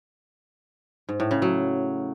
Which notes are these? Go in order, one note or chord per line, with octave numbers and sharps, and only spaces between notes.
G#2
A2
C#3
F#3